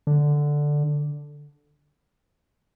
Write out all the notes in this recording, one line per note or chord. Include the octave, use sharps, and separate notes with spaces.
D3